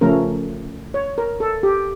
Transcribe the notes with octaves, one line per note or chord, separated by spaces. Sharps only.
C#3 F3 A3 C#4 A#4
C#5
A#4
A4
G4